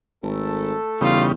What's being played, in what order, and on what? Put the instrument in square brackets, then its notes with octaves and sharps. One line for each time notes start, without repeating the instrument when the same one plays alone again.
[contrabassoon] G#1 [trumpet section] A3 A4
[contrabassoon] E2 [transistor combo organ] C#3 G3 D#4 [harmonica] F4